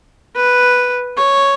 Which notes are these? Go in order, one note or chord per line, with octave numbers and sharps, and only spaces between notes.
B4
C#5